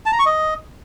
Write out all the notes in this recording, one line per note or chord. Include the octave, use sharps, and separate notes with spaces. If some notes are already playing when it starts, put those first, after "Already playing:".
A5
A#5
C#6
D#5